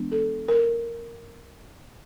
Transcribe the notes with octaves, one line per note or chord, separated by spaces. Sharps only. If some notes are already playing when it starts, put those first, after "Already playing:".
Already playing: E3 G#3 B3 D4
A4
A#4